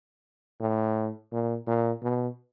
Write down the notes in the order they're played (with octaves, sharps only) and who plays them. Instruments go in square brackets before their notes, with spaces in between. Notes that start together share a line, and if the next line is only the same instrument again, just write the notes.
[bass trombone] A2
A#2
A#2
B2